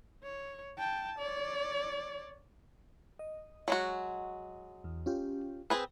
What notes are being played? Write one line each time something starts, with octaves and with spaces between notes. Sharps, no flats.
C#5
G5 A5
C#5 D5
D#5
F#3 G#3 F#4
E2
C#4 F4 G4
C4 G#4 B4